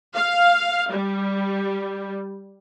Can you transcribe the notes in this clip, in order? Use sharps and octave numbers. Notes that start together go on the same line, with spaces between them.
F5
G3